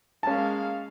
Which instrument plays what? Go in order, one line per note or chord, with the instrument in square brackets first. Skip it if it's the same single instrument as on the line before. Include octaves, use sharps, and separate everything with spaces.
[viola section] G#3 A#3 F5 [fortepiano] C#4 A5